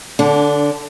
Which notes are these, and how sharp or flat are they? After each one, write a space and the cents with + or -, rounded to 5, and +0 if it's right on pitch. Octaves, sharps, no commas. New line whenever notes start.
D3 +0 D4 -25